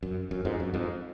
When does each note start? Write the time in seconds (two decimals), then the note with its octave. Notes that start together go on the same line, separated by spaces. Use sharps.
0.03 F#2
0.31 F#2
0.45 F2 G#2
0.60 F#2
0.74 F2 G#2